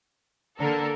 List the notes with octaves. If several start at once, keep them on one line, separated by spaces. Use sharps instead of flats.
D3 A#3 A4 A#4